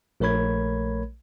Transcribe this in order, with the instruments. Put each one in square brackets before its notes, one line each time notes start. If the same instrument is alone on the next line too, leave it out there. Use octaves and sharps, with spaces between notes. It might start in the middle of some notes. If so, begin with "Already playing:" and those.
[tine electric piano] A#1 A3 A#4 C#5 B5 G#6